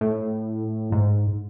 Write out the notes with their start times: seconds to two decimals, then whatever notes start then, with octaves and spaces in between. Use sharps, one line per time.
0.01 A2
0.92 G#2